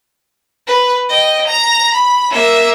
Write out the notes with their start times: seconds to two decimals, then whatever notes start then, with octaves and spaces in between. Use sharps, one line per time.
0.68 B4
1.10 D#5 G5
1.48 A#5 F7
1.95 B5
2.31 A#3 E5